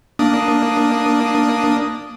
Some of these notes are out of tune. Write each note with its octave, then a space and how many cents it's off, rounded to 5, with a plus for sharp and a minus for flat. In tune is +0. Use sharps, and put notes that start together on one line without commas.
A#3 +0 D4 +0 D#6 +0